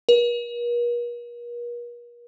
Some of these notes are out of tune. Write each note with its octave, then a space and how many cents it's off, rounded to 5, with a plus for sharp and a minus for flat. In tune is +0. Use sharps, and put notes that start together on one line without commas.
A#4 +45